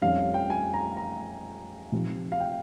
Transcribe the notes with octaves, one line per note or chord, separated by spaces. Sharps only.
F2 D#3 G3 C#4 F5
F5
G5
G#5
A#5
A#5
C3 F3 C4 D#4
F5
G5